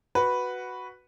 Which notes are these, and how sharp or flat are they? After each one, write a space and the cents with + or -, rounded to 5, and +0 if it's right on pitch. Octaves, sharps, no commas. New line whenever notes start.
F#4 +0 B4 +0 F#5 +0